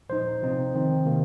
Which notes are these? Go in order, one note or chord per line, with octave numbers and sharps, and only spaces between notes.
A#2 F3 D#4 C5
C3 F3 C4 D#4
D#3 C4 D#4
C3 D#3 A#3